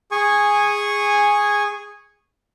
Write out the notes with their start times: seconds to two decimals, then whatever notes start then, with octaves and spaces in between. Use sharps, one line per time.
0.11 G#4 G#5 C#6